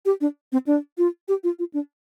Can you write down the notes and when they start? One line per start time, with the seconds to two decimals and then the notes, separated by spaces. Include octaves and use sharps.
0.06 G4
0.21 D4
0.52 C4
0.67 D4
0.98 F4
1.28 G4
1.44 F4
1.59 F4
1.74 D4